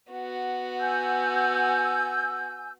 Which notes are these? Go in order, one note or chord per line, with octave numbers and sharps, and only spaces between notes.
B3 F#4
G#5 E6 G6